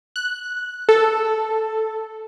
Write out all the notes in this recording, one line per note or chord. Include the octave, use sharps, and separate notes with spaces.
F#6
A4